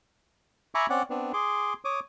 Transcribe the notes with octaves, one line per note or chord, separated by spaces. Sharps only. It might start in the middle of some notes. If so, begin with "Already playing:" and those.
E5 G#5 A#5 B5 C#6 D6
C4 C#4 D5 F#5
B3 C4 D4
G#4 C6 D6
C#5 D6 D#6